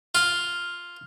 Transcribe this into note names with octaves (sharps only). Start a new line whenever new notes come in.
F4